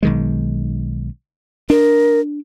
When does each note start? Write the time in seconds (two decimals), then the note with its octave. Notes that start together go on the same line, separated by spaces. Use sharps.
0.03 B1 D#3 G#3
1.70 D4 A#4